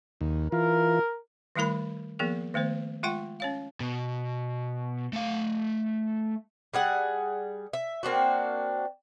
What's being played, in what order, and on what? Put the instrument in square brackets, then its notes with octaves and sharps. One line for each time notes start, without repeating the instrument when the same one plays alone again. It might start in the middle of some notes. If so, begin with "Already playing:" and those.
[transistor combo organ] D#2
[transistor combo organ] E3 F4 [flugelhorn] A#4
[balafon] D#3 G3 A3 E4 A#4 B5
F3 A#3 B3 G#4 A#4
D#3 A3 B3 C5
G#3 F4 F#5 G5 C#6
C#4 C#5 F5
[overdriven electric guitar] B2
A3 F5
[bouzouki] G3 G#4 F#5
E5
A#3 C4 D4 F#4